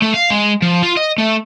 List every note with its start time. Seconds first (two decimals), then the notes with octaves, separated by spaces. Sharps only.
0.02 A3
0.14 F5
0.30 G#3
0.62 F3
0.83 F4
0.97 D#5
1.18 A3